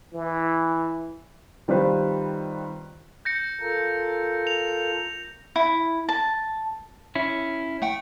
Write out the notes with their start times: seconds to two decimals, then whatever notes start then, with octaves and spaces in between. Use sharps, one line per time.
0.13 E3
1.68 D#3 G3 C4 F4 B4 C5
3.25 G6 A#6 C#7
3.61 F4 A4 A#4
4.47 F7
5.56 E4
6.09 A5
7.15 C#4 E4
7.82 A3 F#5 G5